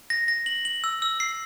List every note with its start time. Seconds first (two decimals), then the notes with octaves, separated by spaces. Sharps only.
0.10 A#6
0.28 A#6
0.46 F#7
0.65 F#7
0.84 E6
1.02 E6
1.20 C7